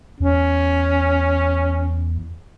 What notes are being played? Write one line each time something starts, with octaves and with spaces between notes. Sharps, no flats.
E2 C#4